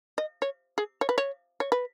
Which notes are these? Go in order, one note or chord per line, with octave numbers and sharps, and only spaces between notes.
D#5
C#5
G#4
C#5
B4
C#5
C#5
B4